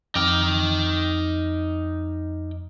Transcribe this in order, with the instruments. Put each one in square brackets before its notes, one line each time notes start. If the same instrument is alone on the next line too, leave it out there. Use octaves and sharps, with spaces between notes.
[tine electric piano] F2 D6 F6 [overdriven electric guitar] D#4 G5